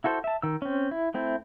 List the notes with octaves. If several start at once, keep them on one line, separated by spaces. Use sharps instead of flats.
E4 F#4 A4 C5
E5 A5
D#3 E6
C4 C#4
E4
A3 C4 E4